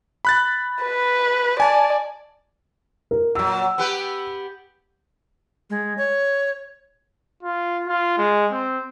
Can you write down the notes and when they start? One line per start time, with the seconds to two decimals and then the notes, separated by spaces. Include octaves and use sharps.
0.25 B5 F#6 A6
0.82 B4
1.60 D5 G#5 A5
3.11 A#4
3.35 A#2 F#3 E6
3.78 B3 G4 B4
5.70 G#3
5.98 C#5
7.43 F4
7.87 F4
8.18 G#3
8.51 C4